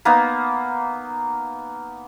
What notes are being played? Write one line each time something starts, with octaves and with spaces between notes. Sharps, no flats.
A#3 B3 D#4